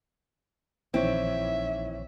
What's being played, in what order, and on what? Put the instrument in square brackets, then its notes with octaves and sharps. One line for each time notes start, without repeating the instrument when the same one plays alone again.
[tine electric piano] A#1 C#5 [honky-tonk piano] D#3 E3 E4 [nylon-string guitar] C4 [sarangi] E5